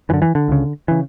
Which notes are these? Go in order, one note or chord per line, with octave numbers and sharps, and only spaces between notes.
F#2 D3 E3
E3
D3
C#2 C#3
C#3 E3